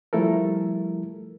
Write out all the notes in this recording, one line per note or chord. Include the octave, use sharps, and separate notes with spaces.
F3 G3 A3 E4 A4 A#4